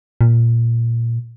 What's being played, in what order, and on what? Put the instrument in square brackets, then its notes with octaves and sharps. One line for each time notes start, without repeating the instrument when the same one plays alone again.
[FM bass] A#2